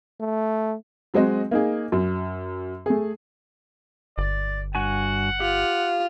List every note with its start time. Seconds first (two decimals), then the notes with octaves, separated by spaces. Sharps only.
0.20 A3
1.14 F#3 G#3 C4 F#4 D#5
1.51 A#3 D#4 G#4
1.92 F#2
2.86 A3 G#4
4.18 G1 D5
4.75 G2 F#4 F#5 G#5
5.40 F4 G4